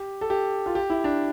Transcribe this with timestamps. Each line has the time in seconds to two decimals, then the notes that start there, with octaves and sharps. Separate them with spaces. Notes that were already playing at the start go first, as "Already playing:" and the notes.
Already playing: G4
0.21 A4
0.30 G4
0.66 F4
0.75 G4
0.90 E4
1.04 D4